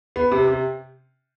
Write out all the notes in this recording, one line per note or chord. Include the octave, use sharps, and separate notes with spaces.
B3
C3
C3